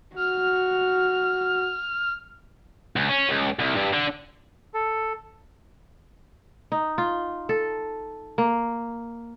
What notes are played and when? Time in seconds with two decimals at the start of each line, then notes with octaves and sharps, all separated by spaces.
0.16 F#4 F6
2.96 C#2
3.09 C#4
3.29 C#2
3.59 C2
3.76 G2
3.93 D3
4.74 A4
6.72 D#4
6.98 F4
7.49 A4
8.38 A#3